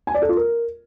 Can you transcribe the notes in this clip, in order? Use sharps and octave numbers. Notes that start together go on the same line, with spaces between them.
G#5
D5
A4
F4
A#4